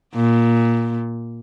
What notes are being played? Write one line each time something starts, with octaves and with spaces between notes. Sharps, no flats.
A#2